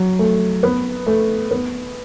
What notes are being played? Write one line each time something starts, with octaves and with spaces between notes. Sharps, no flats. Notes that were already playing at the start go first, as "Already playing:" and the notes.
Already playing: F#3
A3
B3
A3
B3